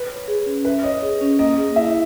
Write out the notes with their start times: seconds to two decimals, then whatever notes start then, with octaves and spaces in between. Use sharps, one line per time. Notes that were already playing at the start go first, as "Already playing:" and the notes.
Already playing: B4
0.10 C#5
0.28 G#4
0.46 C#4
0.65 B4 E5
0.83 C#5 D#5
1.02 G#4
1.21 C#4
1.39 A#3 D#5
1.58 G#4
1.76 E4 E5